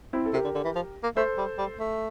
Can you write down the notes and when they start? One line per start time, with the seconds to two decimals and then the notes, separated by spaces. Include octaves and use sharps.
0.13 C4 E4
0.26 A4
0.34 C3 G4 A#4
0.45 D3
0.55 D3
0.65 E3
0.76 F3
1.04 A#3
1.17 A3 A4 C5
1.38 G3
1.59 G3
1.79 A3